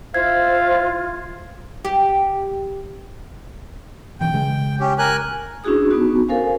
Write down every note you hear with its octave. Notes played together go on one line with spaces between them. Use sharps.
E4 F4 C5 E5 F5 G#6
G4
B1 E3 G5
C#3 G#3
C#4 G4
A#4 G#5 F#6
C#4 D4 E4 F#4 G#4 D#6
B3 C#4 D#4 F#4
A4 A#4 C5 F5 G#5